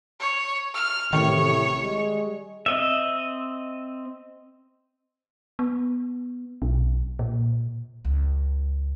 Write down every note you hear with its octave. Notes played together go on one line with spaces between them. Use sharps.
C#5
F6
A1 A2 C3 D#3 C#5
G3 G#3
C4 D#5 E5
B3
B1
A#2
C#2